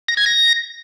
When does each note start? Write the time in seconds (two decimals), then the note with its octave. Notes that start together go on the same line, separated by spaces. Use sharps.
0.08 A#6
0.17 G#6
0.26 A#6